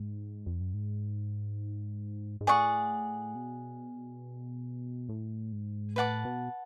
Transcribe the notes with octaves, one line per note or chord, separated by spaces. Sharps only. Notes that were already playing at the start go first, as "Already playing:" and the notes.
Already playing: G#2
F2
F#2
G#2
G#2
A2 G#4 D5 F#5 C#6
B2
A2
G#2
A2 B4 F#5 A5 D6
B2